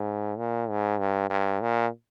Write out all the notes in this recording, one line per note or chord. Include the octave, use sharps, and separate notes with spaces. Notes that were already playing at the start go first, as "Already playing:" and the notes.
Already playing: G#2
A#2
G#2
G2
G2
A#2